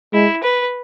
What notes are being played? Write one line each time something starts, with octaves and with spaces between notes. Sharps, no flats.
G#3 E4
B4